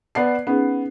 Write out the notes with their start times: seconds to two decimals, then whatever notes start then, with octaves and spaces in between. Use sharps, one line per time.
0.15 B3 D5 A5 C7
0.47 B3 C#4 D#4 G#4